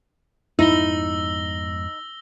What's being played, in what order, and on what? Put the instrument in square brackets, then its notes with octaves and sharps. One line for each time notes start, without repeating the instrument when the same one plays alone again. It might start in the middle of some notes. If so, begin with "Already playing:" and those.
[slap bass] F2 G#2 B3 [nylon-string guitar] D#4 [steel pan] E4 [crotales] E6 A#6 G7